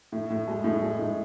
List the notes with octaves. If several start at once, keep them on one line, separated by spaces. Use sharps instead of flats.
A2
A2
G#3
A2
G#3
A2